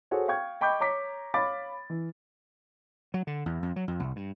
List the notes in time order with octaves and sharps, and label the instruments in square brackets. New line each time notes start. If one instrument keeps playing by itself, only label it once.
[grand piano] F#4 G#4 A4 C5 C#5
F5 G5 C#6 G#6
D#5 G5 B5 C#6 D6 G6
C#5 A#5 D6 B6
C#5 F5 B5 D6 A6
E3
[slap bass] F#3
D3
E2
F2
F#3
F2
C2
G2